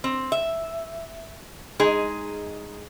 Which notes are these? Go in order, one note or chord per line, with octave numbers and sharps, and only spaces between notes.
C4
E5
G#3 D#4 G#4